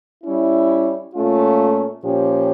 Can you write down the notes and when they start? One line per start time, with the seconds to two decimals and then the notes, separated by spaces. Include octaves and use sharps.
0.24 G3 C#4 E4
1.15 A#2 A3 C#4 F4
2.04 A#2 F3 C#4 G4